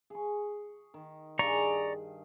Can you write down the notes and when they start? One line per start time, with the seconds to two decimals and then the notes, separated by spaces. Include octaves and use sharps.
0.10 G#4 C#6
0.94 D#3
1.39 G2 G#4 D5 A#5 C#6